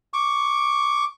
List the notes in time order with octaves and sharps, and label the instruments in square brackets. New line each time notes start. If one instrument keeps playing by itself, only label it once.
[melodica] C#6 D6